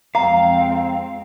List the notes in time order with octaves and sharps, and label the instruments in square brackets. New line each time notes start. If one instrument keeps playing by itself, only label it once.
[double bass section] F2 G#3 C4 [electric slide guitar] F5 [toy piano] A#5